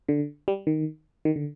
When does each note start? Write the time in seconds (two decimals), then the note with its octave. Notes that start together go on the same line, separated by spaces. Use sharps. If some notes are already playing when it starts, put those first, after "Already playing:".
0.09 D3
0.48 G3
0.67 D#3
1.25 D#3
1.36 D3